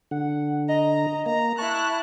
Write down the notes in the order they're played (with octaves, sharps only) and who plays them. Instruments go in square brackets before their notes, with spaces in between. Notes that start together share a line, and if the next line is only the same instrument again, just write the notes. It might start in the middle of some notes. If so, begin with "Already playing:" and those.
[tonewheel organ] D3 [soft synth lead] F#5
[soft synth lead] D#5 [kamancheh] A#5
[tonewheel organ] A#3 [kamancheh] A#5
[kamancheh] E4 F#6 [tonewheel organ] A5 [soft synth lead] C#6